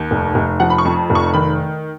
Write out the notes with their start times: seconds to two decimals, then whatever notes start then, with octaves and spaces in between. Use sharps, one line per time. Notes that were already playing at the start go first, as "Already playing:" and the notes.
Already playing: D#2
0.11 F1
0.35 F1
0.60 F3 F#5
0.70 B5
0.78 C#6
0.85 F2
1.10 F1
1.15 C#6
1.34 D#3 B5